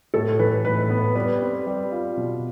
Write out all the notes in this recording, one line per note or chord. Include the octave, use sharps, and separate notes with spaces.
A2 A4
E3 B4
A2 B4
B3
G3 B4
C4
G3
F4
B2